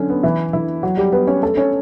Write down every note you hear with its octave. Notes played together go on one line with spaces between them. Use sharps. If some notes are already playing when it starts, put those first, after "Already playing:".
Already playing: D3 F#3 C#4 D4
B3
E3 E4
E3 E4
F#3 F#4
G3 G4
B3 B4
C#4 C#5
A3 A4
C#4 C#5